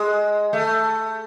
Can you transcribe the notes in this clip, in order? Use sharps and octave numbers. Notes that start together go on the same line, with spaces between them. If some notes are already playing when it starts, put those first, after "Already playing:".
Already playing: G#3
A3